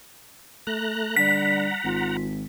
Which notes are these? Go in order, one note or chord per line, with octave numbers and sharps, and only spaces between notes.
A3 A#5 F#6
D3 G3 F#5 A#5 B6
G#1 F4